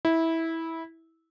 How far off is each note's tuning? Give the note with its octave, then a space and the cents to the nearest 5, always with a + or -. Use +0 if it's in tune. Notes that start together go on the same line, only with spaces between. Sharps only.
E4 -15